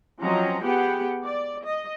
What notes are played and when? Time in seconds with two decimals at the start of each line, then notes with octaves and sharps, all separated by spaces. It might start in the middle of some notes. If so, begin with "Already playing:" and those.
0.21 F3 F#3 C4 C#4 D#5 A#5
0.63 B3 G4 G#4 F#5 G5
1.24 D5
1.65 D#5